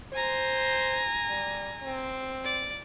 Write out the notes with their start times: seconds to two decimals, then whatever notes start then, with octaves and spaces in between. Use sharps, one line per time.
0.13 C5 G#5 A#5
1.28 G3
1.83 C4
2.44 D5